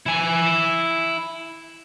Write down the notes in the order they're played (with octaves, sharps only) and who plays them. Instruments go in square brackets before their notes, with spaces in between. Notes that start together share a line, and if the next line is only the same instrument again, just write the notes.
[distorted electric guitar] E4 G#5